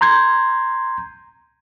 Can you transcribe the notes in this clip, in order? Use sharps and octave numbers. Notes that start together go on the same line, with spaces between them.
A#5 C6 G6 G#6